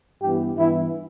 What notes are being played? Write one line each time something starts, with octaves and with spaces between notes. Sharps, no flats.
G2 E3 B3 G4
G2 E3 B3 E4